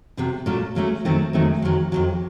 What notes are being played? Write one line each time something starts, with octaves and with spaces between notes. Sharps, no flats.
F2 C3 F#3
A#2 F#3 A3 C#4
A#2 F#3 A3 C#4
F2 D#3 F#3 A3 C4
F2 D#3 F#3 A3 C4
F2 D#3 F#3
F2 D#3 F#3